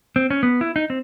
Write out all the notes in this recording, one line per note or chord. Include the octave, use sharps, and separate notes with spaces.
C4
C#4
B3
E4
D#4
C4